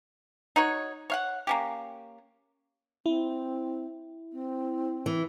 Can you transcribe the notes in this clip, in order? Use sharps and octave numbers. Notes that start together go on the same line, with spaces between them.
D#4 F#4 C#5
C#5 F5 F#5
A#3 C#4 G4
C4 E4
C4
E3